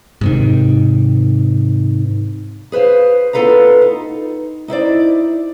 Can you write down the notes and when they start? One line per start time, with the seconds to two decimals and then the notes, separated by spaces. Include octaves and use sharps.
0.21 G#2 C3 D#3
2.72 G#4 B4 C5 F5
3.33 B3 F4 A4 B4 F5 A#5
3.82 D#4
4.68 D#4 E4 C5 D5